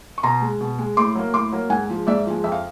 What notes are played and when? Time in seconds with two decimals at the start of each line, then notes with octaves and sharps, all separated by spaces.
0.18 C#6
0.23 B2 A#5 C6
0.42 G#3
0.61 B2
0.79 G#3
0.97 A2 C6 D6
1.15 F#3 A#3
1.34 A2 C6 D6
1.52 F#3 A#3
1.70 G#2 F#5 G#5
1.89 F3 G#3
2.07 G#2 D5 E5
2.26 F3 G#3
2.44 F2 E5
2.52 F5